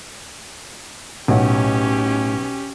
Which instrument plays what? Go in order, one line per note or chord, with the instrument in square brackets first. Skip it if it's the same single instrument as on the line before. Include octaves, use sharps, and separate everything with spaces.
[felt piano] B1 [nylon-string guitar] A2 F#5 [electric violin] C#4 G4